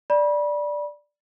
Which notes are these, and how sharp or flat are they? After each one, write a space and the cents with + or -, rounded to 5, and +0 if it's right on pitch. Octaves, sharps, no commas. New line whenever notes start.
D5 +0 B5 -30